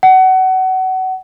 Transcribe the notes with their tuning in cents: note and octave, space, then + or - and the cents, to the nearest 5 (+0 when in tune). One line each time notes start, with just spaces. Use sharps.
F#5 +25